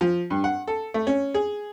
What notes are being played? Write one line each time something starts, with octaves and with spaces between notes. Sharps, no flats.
F3
G2
F#5
A4
A3
C#4
G#4